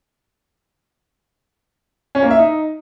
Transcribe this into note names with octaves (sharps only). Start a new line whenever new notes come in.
C#4
A#3
E5
D#4